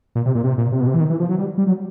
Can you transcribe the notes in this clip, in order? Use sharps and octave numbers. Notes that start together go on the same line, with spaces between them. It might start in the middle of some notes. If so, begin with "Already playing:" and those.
A#2
C3
A#2
C3
A#2
C3
B2
C3
E3
D#3
E3
F3
F#3
G3
G3
F#3